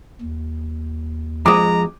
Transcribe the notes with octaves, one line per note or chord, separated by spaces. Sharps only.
D#2
F2 G#3 A#5 D6 D#6